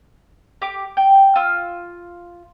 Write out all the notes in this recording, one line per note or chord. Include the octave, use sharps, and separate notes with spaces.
G4 D6
G5
F4 E6